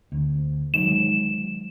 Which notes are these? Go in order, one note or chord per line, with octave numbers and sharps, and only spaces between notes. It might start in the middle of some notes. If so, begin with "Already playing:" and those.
D2
D#3 F#3 G#3 E7